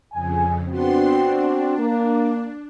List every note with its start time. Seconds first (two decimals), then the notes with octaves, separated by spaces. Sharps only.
0.13 F2 C#3 G#5
0.68 B3 C4 D4 F#4 C6
1.24 D4
1.78 A#3